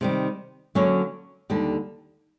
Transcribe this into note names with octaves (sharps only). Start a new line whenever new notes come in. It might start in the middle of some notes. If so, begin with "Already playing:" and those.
C3 D#3 G3
D3 F#3 A#3 C#4
D#2 D3 G3